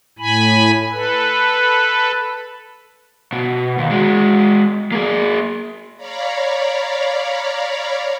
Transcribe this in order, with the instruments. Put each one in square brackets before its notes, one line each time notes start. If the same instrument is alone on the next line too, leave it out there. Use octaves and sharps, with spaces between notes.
[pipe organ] A2 G#5 B5
A4 B4
[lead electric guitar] B2
D#2
G#3 F#4
A#3 G#4
[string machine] C#5 D5 F5 A#5 B5